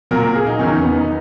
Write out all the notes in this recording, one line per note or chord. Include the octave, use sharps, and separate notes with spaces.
A#2 F#3 A#4
A#4
G#4
D#4
E2 D#3 F#3 C#4
B3
D#4